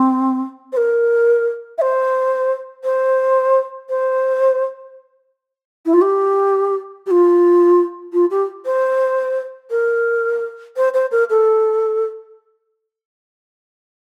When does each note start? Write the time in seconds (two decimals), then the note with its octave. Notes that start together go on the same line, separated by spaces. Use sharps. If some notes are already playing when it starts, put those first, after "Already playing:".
Already playing: C4
0.72 C5
0.77 A#4
1.78 E5
1.81 C5
2.84 C5
3.89 C5
5.85 E4
5.93 F4
6.01 G4
7.06 G4
7.11 F4
8.13 F4
8.30 G4
8.65 C5
9.70 A#4
10.76 C5
10.94 C5
11.11 A#4
11.30 A4